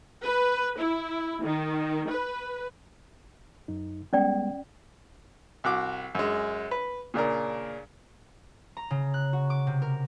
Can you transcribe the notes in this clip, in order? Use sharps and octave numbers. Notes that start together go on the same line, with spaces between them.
B4
E4
D#3
B4
F#2 D#4
G3 G#3 B3 C#4 D5 G5
C2 F#4 D6
F#2 G#3
B4
A#2 C#3 D4 A#4
A#5
C#3
F#6
F#4
D6
C3
A#4